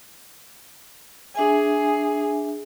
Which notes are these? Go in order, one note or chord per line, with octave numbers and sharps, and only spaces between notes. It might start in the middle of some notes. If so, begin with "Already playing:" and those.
D4 G#4 E5 G#5